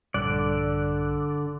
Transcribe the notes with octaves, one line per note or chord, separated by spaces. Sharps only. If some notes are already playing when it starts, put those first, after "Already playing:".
A#1 G2 D3 D5 F#6